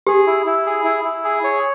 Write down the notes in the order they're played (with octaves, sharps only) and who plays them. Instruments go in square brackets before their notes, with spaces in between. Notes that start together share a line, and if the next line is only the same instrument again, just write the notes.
[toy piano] G4 [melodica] G#4
[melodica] E4
E4
G#4
E4
E4
G#4
C#5